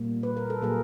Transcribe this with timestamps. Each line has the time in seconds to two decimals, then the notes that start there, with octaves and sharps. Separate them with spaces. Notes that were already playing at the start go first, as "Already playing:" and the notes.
Already playing: A#2 G3 A#3
0.23 B4
0.37 A#4
0.50 A4
0.61 A#2 F#3 A#3 G#4 A#4